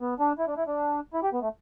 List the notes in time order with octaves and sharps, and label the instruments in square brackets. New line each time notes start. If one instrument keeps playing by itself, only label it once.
[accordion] B3
D4
E4
D4
E4
D4
E4
G4
B3
A3